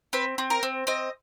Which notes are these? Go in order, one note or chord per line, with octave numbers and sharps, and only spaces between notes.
C4 B4
C4
A#4
C4
C4 D#5